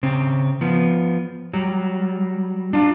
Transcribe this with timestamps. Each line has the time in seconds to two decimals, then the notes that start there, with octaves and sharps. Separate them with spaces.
0.03 C#3 C4
0.61 F3 B3
1.54 F#3 G3
2.73 D4 F4